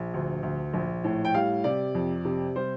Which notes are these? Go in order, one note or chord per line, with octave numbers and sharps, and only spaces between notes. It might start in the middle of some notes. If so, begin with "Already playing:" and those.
Already playing: A#1
D2
D2
A#1
A2
G5
G3 F5
C3 D5
F2
C3
G3 C5